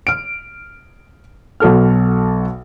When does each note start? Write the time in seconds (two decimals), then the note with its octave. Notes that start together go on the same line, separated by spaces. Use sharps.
0.07 F6 D7
1.60 B1 F#4 A4 F6